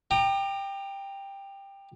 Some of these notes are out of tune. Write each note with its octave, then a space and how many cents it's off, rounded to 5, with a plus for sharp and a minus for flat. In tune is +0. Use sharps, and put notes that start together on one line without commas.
G5 +10 A#5 -10 D6 +40